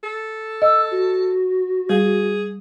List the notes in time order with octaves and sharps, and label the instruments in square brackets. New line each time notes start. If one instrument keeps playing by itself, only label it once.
[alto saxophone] A4
[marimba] D#5 [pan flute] E6
[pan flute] F#4
[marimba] G3 [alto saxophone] G#4